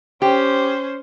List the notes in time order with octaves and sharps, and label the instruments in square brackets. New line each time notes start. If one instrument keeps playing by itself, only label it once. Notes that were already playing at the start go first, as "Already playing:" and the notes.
[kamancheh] C#4 C5 [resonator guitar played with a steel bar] G4